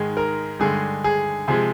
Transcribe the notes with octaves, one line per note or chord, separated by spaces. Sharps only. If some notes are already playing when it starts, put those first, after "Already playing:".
Already playing: G#2 D#3 G#3 G#4
A#4
G2 D3 G#3 G#4
G#4
C3 F3 G#3 G#4